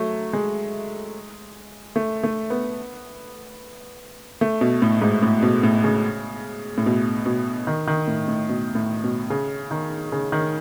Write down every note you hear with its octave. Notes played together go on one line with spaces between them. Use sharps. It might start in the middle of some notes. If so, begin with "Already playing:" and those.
Already playing: F#3 A3
G#3
A3
A3
B3
A3
B2
A2
G#2
A2
B2
A2
C#3
A2
B2
B2
D#3
D#3
A2
A2
B2
A2
B2
C#3
D#3
C#3
D#3